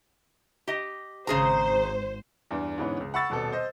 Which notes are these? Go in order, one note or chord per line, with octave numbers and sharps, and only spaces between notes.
G4 D#5
G#1 C#3 G#4 C5 A#5
E2 G2
G#2 D3 E3 B3 C#4
C#2
F#5 B5 C#6 E6 A6
D#1 B2 A4
C5 D#5